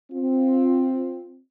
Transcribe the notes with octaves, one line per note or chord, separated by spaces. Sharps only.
C4 F4